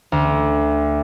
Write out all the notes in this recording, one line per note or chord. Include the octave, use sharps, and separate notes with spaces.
D2